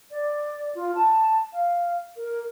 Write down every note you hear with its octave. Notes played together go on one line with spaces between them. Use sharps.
D5
F4
A5
F5
A#4